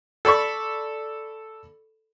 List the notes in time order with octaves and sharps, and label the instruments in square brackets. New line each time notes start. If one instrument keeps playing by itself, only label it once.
[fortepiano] A4 D5 B5 C#6